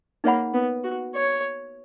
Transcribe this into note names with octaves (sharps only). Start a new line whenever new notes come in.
A#3 D#4 G#4 C#5 F#5 B5
B3
F#4
C#5